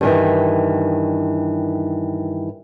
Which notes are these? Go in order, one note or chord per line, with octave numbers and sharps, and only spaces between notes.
G2 D#3 E3